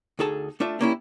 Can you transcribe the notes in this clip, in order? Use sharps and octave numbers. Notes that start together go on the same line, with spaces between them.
D2 D#4 G#4 A4 A5
A3 D4 F4 E5
G3 A#3 C#4 E4